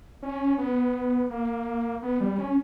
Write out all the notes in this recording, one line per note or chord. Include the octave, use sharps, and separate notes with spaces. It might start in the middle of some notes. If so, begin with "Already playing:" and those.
C#4
B3
A#3
B3
G3
C#4